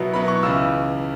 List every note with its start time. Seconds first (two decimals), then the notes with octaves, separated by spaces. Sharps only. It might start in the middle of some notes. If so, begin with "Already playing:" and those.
Already playing: B2 F#3 B3 E4
0.13 B2 F#3 B3 E4 B5
0.28 C#6
0.43 C#2 C#3 E3 E6